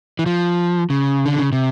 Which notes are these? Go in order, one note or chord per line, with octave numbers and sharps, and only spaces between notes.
E3
F3
C#3
D3
C#3
C3